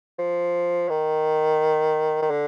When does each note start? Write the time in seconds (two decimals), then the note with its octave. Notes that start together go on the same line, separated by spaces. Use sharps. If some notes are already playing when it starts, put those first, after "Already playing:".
0.19 F3
0.90 D#3
2.22 D#3
2.31 D3